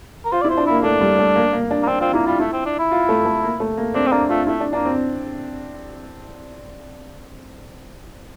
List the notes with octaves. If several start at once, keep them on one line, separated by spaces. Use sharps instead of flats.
A#4
F4 C5
D5
E4
C5
D4
A#3 E4
A3 D4
G3
A3
A#3
A#3
D4
A#3
C4 D4
C4 F4
A#3 E4
G3 F4
A3 E4
C4
D4
E4
F4
A3
A3
A#3
A3
A#3
C4 D4
C4
A#3 D4
A3 F4
A3 E4
D4
A#3 D4
C4